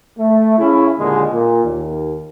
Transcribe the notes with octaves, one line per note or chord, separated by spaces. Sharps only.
A3
C#3 C#4 E4
D#2 A#2 D3 G#3
A#2
D#2